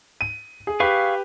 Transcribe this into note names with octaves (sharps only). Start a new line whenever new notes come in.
D#7
G#4
G4 G#4 B4 F5 C#6